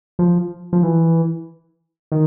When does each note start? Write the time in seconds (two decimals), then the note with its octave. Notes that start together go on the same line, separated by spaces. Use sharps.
0.19 F3
0.73 F3
0.83 E3
2.12 D#3